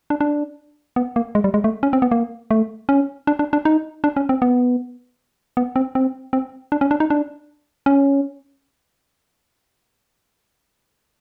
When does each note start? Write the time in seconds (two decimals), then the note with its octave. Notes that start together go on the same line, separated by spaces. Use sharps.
0.10 D4
0.21 D4
0.96 B3
1.16 A#3
1.35 G#3
1.44 G3
1.54 G#3
1.64 A3
1.83 C#4
1.93 C4
2.02 B3
2.11 A#3
2.51 A3
2.89 C#4
3.27 D4
3.39 D4
3.53 D4
3.65 D#4
4.04 D4
4.16 C#4
4.29 C4
4.42 B3
5.57 B3
5.76 C4
5.95 C4
6.33 C4
6.72 D4
6.81 C#4
6.91 D4
7.00 D#4
7.10 D4
7.86 C#4